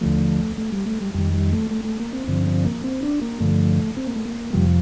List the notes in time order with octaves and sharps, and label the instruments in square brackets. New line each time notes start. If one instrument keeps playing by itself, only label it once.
[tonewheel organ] D#2 D3 F3 A3
A3
G3
A3
G3
F2 D#3 G3
G3
A3
A3
A3
A#3
C4
G2 D3 F3 C4
C4
A#3
C4
D4
A#3
G2 D3 F3 A3
C4
A#3
A3
A#3
F2 C3 F3 G3